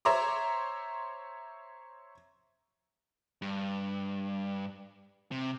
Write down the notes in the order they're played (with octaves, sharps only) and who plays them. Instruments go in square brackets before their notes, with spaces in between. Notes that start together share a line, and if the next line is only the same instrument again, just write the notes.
[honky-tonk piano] C5 C#5 E5 A#5 C6 D6
[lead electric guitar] G2
C3